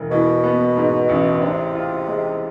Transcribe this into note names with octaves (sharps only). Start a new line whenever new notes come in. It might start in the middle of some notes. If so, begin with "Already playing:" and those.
Already playing: E1
B2 E3
B3
G#2
A1
C3 D4
F4
G#3